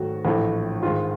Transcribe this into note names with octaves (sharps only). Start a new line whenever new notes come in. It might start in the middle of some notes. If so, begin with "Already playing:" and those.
Already playing: G#2 D#3 F#3 A3 F#4
A#1 A2 E3 A3
G#2 D#3 G#3 F4